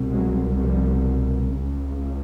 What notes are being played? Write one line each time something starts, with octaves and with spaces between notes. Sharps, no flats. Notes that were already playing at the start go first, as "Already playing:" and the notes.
Already playing: C2 B2
F#3 G#3
F3 G3
C#2 C#3